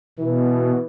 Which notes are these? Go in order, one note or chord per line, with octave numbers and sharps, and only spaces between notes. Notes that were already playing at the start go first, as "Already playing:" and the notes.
B2 E3